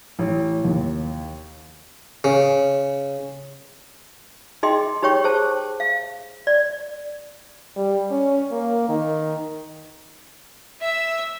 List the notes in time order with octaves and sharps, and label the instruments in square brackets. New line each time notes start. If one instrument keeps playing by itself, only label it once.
[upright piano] A1
D#2
[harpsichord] C#3
[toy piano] D#4 G#4 D#5 G5 C6
D#4 G4 C#5 G5 C#6
G#4 C5 A5
F5
D5
[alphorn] G3
C#4
A#3
D#3
[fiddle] E5 E6